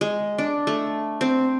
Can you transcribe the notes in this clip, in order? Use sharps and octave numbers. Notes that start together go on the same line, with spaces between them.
G#3
D4
A3
C4